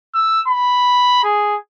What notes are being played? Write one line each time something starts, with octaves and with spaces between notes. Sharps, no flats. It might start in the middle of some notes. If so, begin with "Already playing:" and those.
E6
B5
G#4